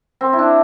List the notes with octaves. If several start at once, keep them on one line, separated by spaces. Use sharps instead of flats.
C4
E4
D4